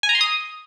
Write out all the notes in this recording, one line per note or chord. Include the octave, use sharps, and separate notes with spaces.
G#5
A#5
C6
D#6